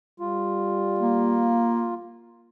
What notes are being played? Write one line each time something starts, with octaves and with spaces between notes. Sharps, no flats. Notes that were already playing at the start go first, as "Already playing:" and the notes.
G3 F4
A#3